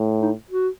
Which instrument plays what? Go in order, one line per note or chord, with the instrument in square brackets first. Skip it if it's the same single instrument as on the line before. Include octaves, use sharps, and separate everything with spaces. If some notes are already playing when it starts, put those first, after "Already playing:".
Already playing: [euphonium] A2
[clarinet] D#4
F#4